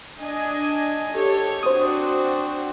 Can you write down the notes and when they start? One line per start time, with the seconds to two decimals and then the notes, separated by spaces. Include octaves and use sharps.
0.20 D4 D#5 G#5
1.13 G4 A4 C#5
1.63 C4 D4 F#4 C5 D#6